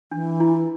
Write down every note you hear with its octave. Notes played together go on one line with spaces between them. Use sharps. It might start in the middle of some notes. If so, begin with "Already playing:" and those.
E3 D4
E4